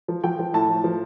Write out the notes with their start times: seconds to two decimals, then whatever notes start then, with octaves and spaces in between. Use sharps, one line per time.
0.08 F3
0.24 F3 G5
0.39 F3
0.53 A2 A5
0.69 A2
0.84 F3